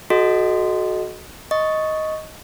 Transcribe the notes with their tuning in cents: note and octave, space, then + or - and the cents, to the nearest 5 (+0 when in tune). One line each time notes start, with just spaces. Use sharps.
F#4 +0 A4 -40 D#5 +0
D#5 +10 C#6 +0